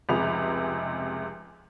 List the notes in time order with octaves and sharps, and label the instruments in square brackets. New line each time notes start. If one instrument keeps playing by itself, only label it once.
[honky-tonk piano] F1 C#2 C3 G#4 B5 F7